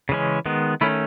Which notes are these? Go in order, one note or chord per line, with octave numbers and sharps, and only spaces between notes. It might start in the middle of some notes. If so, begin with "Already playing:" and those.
C#3 E3 G#3 C#4
D#3 G#3 B3
D#3 A3 C#4 E4